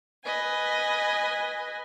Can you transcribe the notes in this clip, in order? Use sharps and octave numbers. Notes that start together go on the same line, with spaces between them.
B4 D#5 G#5